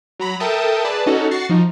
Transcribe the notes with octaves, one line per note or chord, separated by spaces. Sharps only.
F#3 A#5 B5
A4 A#4 E5 G5 A5 D#6
G#4 B4 D5 A5
C#4 D#4 F#4 A4
F#4 C#6 A6 C7
F3 D#4